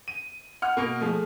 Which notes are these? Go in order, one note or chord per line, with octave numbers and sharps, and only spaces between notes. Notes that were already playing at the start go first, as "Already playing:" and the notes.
D#7
F#5 F6
B2 A#3
F3 G#3 A3